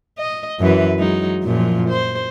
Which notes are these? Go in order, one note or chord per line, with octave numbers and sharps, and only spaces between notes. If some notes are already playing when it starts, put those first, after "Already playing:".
D#5
F#2 E3 B4
F#3 G#3 D#4
F#2 A#2 F3
C5